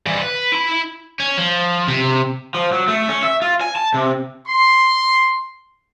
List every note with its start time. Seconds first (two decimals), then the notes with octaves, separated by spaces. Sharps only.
0.06 G2 E3
0.22 B4
0.52 E4 B5
1.20 C#4
1.38 F3
1.88 C3
2.55 F3
2.72 F#3
2.88 A3
3.08 C#4
3.23 E5
3.42 F4
3.61 G#5
3.76 A5
3.94 C3
4.47 C6